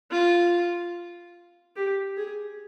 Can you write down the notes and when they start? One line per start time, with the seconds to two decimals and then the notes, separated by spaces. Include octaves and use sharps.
0.12 F4
1.76 G4
2.17 G#4